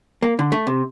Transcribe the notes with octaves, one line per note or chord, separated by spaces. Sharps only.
A#3
D3
A3
C3